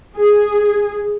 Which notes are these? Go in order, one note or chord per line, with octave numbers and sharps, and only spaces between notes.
G#4